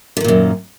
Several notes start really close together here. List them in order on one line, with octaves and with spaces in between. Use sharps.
D3 D#3 A#2 F#2